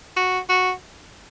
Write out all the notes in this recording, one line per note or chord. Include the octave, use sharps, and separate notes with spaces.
F#4
F#4